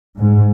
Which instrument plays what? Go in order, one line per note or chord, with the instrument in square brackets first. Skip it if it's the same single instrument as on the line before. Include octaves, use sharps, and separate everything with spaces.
[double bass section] G#2